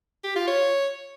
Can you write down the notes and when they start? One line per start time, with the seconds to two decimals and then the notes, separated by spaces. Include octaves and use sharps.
0.24 G4
0.36 F4
0.47 C#5